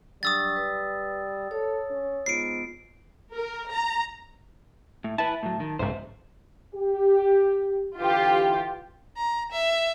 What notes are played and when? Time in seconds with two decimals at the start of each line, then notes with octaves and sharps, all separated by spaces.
0.23 F#3 G3 D4 C#6 D#6 E6 A6
0.56 B4
1.51 A4 C#5
1.90 C#4
2.26 G#2 B3 F4 C7 D7
3.34 A#4
3.72 A#5
5.04 A2
5.18 E4 B4 A5
5.43 A2 F#3
5.60 D#3
5.79 B1 G#2 C#3 A3 C5
6.73 G4
7.99 D3 E3 F4 G4 B4
9.17 A#5
9.51 E5